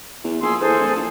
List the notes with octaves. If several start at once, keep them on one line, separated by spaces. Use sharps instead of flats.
E2
A#1 G#4 C6 E6
E3 G#4 A4 C5
D1
A#1